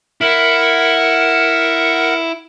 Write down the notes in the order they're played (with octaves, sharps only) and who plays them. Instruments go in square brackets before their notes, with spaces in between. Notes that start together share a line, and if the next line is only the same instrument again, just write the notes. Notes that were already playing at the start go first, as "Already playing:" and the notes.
[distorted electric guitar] E4 [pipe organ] A#4 F#5